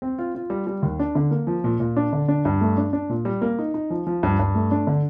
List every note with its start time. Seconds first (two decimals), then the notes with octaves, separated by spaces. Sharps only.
0.02 C4
0.19 F4
0.35 F4
0.50 G3
0.67 G3
0.83 D#2
0.99 D4
1.15 D3
1.31 A#3
1.47 F3
1.64 A#2
1.80 A#2
1.97 D4
2.13 D3
2.28 D4
2.45 G2
2.61 A3
2.77 D4
2.93 D4
3.10 A#2
3.25 G3
3.41 A#3
3.59 D#4
3.74 D#4
3.90 F3
4.07 F3
4.23 G2
4.39 G2
4.55 A3
4.71 D4
4.87 D3